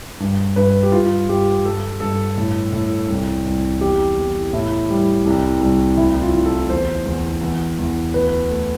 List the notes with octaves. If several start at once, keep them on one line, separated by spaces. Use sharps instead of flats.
G2
G2 B4
G4
G2 F4
G2 G4
G2 A4
G2 A4
A2
A2
C2
C2
E2 G4
E2
A2 E4
G3
C2
C2
D2 E4
F4
D2
A4
E2 C5
E2
E2
E2
D2 B4
A3 A4